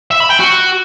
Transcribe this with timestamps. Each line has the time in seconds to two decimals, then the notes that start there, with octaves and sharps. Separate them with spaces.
0.11 E5
0.20 B5
0.30 G5
0.40 F#4